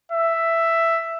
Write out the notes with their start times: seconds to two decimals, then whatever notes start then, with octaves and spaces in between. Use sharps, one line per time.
0.12 E5